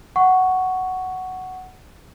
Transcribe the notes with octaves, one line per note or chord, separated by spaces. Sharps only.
F#5 C#6